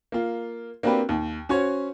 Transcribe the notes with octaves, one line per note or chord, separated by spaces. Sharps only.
A#3 F4
A#3 C4 D4 F#4 G4 B4
D#2
C#4 F#4 C5 C#5